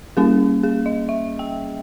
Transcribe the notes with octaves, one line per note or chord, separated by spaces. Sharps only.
G3 A#3 C#4 G#4
G#4
D#5
E5
G5